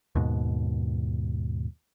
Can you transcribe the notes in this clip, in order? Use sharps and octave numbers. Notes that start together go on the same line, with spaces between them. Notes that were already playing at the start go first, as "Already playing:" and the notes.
D#2 G#2 B2